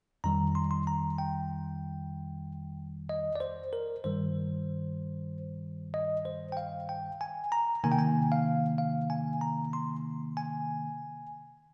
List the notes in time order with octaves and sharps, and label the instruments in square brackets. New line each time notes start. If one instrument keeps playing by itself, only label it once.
[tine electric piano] F2 D#3 G3 A#5
C6
C6
A#5
G5
D#5
D5
C5
A#4
G2 D#3 G3 C5
D#5
C5
G5
F5
G5
G#5
A#5
C3 D#3 A#3 G#5
G5
G#5
F5
F5
G#5
A#5
C6
G#5